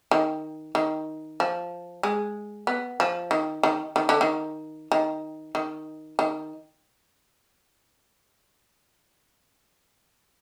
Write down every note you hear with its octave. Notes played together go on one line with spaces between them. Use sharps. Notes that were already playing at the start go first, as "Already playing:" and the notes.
D#3
D#3
F3
G#3
B3
F3
D#3
D#3
D#3
D3
D#3
D#3
D#3
D#3